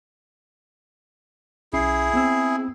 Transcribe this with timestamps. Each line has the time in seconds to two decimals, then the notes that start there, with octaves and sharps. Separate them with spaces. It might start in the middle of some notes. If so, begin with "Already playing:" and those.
1.73 B1 C#4 E4 G#4 C7
2.14 B3 C4 E6